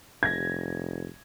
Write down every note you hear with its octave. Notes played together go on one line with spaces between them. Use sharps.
F1 G#6 A#6